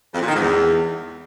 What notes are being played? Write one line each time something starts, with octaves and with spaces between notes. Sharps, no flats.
F2
A#2
D#3
G#2
E2